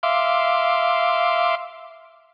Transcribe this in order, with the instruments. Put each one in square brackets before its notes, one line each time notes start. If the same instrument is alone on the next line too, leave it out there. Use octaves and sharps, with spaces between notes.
[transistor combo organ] E5 F5 C6 D6